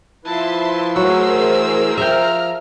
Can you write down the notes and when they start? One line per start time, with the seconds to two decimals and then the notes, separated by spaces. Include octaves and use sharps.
0.25 F3 E4 B4 E5 A5 C6
0.96 F#3 A3 G#4 A#4 C5 F#5 E6
1.32 E3
1.98 F3 E5 G5 A#5 F6